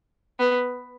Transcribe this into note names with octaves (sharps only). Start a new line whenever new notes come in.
B3